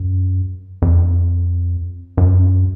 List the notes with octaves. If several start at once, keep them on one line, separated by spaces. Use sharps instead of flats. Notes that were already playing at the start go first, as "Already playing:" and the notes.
Already playing: F#2
F2
F#2